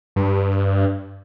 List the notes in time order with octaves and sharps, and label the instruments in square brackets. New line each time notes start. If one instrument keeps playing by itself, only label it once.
[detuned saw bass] G2